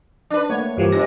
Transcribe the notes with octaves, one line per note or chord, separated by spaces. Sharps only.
D4 B4
A3 A#3 C#5 F#5
G2 E3 F3 G4 A#4 C#5
G2 C3 A#6